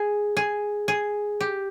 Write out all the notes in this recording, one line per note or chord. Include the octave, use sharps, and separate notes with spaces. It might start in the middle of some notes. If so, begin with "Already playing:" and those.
Already playing: G#4
G#4
G#4
G4